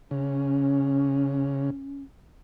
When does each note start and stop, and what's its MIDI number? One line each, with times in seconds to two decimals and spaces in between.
0.11 1.70 49
0.11 2.03 61